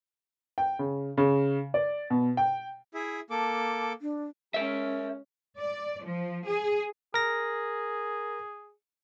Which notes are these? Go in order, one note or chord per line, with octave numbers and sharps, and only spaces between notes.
G5
C#3
C#3
D5
B2
G5
E4 G#4 E5
A#3 A4 A5 D6
D4
G#3 C#4 A#4 E5
D5
F3
G#4
G#4 A#4 A#6